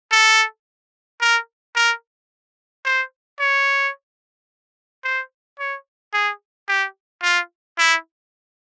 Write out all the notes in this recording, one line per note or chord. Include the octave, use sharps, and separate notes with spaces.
A4
A#4
A#4
C5
C#5
C5
C#5
G#4
G4
F4
E4